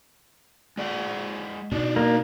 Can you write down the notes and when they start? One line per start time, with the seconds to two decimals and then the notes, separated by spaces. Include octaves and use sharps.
0.77 G#3 D5 F#5
1.72 B2 D4 D#4 D5
1.96 A#3